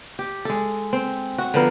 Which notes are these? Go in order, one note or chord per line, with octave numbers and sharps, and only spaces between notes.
G4
G#3 A4
C4
F#4
D3 F3 B3 A#4